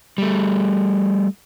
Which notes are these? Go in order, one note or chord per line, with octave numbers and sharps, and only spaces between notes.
G3 A3